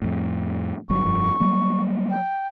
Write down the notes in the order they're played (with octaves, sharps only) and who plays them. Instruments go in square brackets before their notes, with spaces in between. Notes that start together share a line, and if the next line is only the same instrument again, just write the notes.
[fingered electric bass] F2 A2
[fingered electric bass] G1 G2 F#3 [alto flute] C#6
[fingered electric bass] F1 G2 F3
F#3 G3 A#3
[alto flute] G5